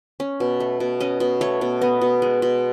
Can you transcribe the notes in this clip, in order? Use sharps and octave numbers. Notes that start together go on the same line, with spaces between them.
C#4
B2
A3
B2
C#4 D#5
B2
A3 C#5
B2
B3 D#5
B2
G#3
B2